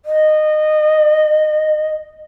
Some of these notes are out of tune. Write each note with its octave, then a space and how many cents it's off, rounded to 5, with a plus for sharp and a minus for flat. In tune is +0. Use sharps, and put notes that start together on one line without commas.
D#5 -20